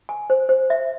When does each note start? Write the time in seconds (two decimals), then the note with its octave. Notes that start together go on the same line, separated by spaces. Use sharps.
0.09 G#5
0.30 C5
0.49 C5
0.70 E5